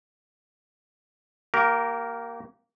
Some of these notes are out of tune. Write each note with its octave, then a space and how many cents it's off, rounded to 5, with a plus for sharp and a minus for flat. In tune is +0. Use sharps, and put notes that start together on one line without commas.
A#3 +0 G4 -35 A#4 +0